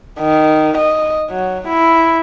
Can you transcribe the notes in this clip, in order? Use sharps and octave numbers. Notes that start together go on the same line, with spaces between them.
D#3
D#5
F#3
E4